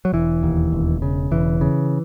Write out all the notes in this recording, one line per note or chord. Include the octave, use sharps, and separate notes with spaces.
F#3
E1 E3
D#2
E1
C#3
E1 E3
C#3